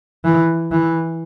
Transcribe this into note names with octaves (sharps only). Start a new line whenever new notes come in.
E3
E3